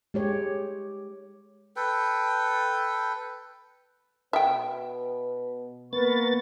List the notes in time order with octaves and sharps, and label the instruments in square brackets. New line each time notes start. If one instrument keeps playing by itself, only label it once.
[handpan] G#3 G4 C#5
[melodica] A4 B4 G5
[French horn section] B2 B4 [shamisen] E5 G5
[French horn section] A#3 [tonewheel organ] B3 A6 [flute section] A#4 B4 C#6